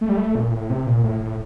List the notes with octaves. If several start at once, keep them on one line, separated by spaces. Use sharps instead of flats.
A3
G3
A3
A#2
A2
C3
A#2
A2
A2